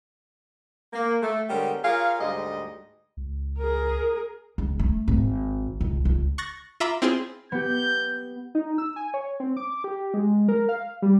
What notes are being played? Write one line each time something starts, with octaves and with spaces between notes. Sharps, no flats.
A#3
A3
D3 G3 G#3 B3 A#4 C#5
F4 G#4 A#4 C#5 F5
D2 G#2 G3 D#5
C#2
G#4 A#4
C#2
A3
G#1
C#2
C#2
C#6 F#6 A6 A#6
F4 E5 A#5 B5 D6
C4 E4 F4 G#4 C5
B3 G4 G6
D#4
E6
G#5
C#5
C4
D6
G4
G#3
A#4
F5
G3